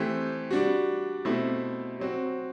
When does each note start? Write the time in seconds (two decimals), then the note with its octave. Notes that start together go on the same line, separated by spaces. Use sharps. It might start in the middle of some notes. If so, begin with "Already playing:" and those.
Already playing: E3 A3 C4 G4
0.50 G3 D4 F#4
1.25 B2 A3 C4 E4
1.99 F#3 C4 F#4